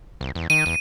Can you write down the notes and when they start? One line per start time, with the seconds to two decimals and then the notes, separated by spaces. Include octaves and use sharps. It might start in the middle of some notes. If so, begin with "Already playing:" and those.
0.21 C2
0.35 E2
0.50 D#3 D#7
0.66 E2